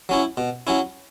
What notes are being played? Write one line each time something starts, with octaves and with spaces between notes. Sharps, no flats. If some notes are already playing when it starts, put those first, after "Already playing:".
F#3 C#4 E4
B2
F#3 C#4 E4